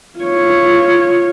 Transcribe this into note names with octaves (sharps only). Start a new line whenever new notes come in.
F4 C#5